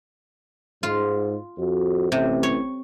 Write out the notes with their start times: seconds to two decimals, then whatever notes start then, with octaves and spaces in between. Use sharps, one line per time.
0.83 G#2 F4
1.58 F2 F#4
2.12 A1 C3
2.43 C#5